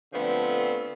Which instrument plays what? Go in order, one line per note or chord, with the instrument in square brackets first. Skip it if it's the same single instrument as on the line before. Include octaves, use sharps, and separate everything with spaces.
[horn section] D3 F3 A3 B3 C4